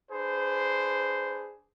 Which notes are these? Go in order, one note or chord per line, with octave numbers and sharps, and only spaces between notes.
D4 G#4 B4 C5